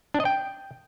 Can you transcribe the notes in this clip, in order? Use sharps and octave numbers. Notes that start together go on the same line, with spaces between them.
D4
D#5
G5